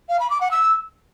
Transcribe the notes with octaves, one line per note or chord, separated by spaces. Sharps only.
F5
B5
D6
F#5
E6